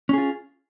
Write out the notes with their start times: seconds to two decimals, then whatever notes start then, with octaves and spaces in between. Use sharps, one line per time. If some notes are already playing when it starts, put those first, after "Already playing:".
0.09 C#4
0.13 G#4
0.18 F4